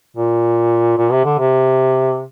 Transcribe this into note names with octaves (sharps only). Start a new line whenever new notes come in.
A#2
A#2
C3
D3
C3